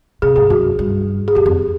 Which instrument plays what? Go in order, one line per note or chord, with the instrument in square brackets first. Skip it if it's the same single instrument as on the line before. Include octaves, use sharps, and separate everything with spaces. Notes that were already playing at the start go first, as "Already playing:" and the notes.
[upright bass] C3 [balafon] G#4
[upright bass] G#2 [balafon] G#4
[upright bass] F#2 [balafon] F#4
[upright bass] G2
[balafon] G#4
[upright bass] F#2 [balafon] G4
[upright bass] F2